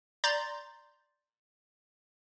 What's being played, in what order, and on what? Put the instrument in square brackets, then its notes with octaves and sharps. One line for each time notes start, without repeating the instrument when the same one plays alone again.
[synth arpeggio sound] D5 A#5 C6 G6 A6